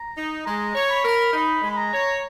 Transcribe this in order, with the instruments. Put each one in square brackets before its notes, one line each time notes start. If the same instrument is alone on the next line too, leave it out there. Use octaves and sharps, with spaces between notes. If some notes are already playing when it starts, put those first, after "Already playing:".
Already playing: [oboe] A#5
[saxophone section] D#4
[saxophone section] G#3 [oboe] A#5
[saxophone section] C#5
[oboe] B5
[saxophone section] A#4
[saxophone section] D#4 [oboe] B5
[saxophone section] G#3
[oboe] B5
A#5
[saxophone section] C#5